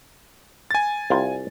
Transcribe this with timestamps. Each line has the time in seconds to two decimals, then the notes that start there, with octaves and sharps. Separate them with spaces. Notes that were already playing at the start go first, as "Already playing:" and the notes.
0.71 G#5 A6
1.10 C2 F4 G5